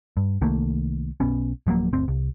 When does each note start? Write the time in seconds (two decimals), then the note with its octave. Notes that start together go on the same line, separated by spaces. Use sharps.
0.17 G2
0.41 C2 D#3 A3 A#3
1.20 B1 B3 C#4
1.67 D1 F3 F#3 A#3
1.93 G1 D2 C4
2.08 C2